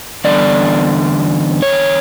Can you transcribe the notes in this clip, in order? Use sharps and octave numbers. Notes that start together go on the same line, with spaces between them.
E2 D3 G3 B3 D5
C#5